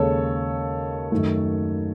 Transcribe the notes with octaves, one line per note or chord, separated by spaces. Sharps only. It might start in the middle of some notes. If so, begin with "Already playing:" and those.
Already playing: D#2 C#3 G#3 A4 C#5
F#2 D#3 A3